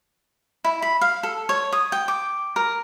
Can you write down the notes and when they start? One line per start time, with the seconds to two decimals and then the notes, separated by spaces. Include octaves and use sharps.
0.64 E4
0.82 B5
1.01 F5
1.23 A4
1.49 C#5
1.72 D#6
1.92 G5
2.08 D6
2.56 A#4